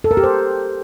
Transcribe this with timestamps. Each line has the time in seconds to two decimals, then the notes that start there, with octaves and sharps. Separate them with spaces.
0.04 A4
0.11 A#4
0.17 G4
0.24 C5